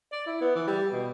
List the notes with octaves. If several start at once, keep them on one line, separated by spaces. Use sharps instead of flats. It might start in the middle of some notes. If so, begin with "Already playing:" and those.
D5
E4
B3
E3
G3
B2